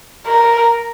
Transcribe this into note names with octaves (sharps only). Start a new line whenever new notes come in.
A#4